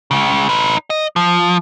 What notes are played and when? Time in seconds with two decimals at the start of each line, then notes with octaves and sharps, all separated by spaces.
0.11 C#2 C#3
0.49 D#4 B4
0.90 D#5
1.16 F3